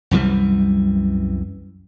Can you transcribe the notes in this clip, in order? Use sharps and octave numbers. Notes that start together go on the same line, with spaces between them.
C2 F#2 E3 G3